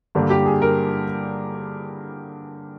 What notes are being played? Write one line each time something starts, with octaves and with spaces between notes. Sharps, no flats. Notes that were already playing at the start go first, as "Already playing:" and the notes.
G2 D3 G3 A#3
G4
G#4
A#4